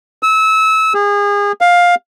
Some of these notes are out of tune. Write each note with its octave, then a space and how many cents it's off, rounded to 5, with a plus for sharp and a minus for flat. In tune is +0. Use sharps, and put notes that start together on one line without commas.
E6 -25
G#4 -30
F5 +15